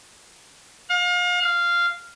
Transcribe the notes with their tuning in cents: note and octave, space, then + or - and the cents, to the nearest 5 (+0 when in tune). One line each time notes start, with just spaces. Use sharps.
F5 +35
F5 -10